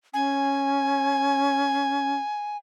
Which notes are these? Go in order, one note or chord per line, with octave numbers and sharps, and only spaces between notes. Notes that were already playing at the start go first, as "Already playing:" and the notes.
C#4 G#5